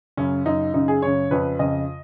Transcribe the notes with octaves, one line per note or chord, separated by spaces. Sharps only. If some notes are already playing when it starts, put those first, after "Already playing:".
F#2 C#3 C#4
F#2 C#3 D#4
F#2 C#3 D#4
G#4
F#2 C#3 C#5
F2 C#3 B4
F2 C#3 D#5